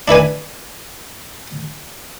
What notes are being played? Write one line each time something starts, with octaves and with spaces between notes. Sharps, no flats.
D4 E4 B4 G#5